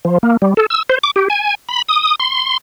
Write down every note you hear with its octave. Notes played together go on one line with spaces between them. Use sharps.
F3
A#3
G3
A4
E6
C5
D6
G4
G#5
B5
D#6
C6